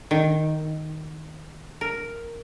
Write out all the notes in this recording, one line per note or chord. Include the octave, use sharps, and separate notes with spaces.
D#3
A#4